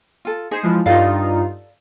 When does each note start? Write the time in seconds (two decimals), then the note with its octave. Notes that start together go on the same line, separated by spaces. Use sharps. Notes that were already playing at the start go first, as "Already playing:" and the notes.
0.25 F4 A4
0.51 D#4 G#4 C5
0.63 E3 F3 G#3
0.86 G2 D#4 F4 A4 D5 F5